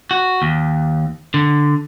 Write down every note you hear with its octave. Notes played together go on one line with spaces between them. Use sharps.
F#4
D#2
D3